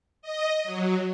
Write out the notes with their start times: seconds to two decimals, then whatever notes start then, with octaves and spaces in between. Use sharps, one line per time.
0.22 D#5
0.64 F#3